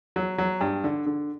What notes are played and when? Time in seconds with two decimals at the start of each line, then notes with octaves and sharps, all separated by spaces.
0.16 F#3
0.38 F#3
0.61 G2
0.84 D3
1.06 D3